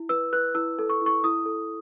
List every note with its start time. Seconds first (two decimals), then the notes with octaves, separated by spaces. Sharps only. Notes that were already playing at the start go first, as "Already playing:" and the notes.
Already playing: E4
0.09 B4 E6
0.33 B4 F#6
0.55 E4 E6
0.79 A4
0.89 C#6
1.01 E4
1.06 C#6
1.24 E4 D#6
1.46 A4